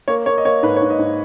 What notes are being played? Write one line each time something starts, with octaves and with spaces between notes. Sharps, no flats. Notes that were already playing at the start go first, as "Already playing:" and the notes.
A#3 C#5
A#3 C#5
D#5
A#3 C#5
G#2 B4
C#5
G#2
D#5
G#2